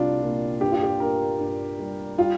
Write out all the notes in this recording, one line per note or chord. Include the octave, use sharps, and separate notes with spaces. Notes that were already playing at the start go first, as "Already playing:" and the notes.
Already playing: C2 G3 D4 F4
A#2
G2 G4
F4
G4
G2 A#4
G2
G3
G3 F4